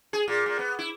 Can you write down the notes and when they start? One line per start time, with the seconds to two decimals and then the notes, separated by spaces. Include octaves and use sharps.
0.13 G#4
0.28 A#2
0.46 A#2
0.59 B3
0.79 E4